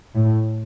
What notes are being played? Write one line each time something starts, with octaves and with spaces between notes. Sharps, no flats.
A2